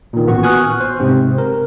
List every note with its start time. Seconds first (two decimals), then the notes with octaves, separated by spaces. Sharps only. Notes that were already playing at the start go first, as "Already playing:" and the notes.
0.13 A#2 D#3
0.26 A1 B3 F#4 C#6
0.43 G#5 C#6 D#6 F6 F#6
0.80 C5
1.00 G#2 C3 C4
1.38 A#4